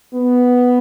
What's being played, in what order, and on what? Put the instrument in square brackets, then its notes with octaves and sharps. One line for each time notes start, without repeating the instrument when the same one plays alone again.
[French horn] B3